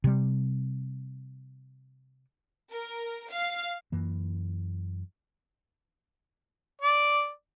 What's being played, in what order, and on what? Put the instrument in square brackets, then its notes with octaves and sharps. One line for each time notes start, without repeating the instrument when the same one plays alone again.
[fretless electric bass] C3 G3
[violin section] A#4
F5
[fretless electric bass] F#2 E3 A#3
[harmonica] D5